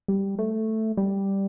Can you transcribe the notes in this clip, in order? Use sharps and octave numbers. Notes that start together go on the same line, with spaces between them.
G3
A3
G3